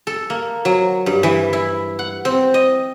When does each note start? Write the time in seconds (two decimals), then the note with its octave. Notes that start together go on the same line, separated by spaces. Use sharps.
0.07 A4
0.30 A#3
0.65 F#3
1.06 G2
1.23 E3
1.53 E4
1.99 F#5
2.25 C4
2.54 D#5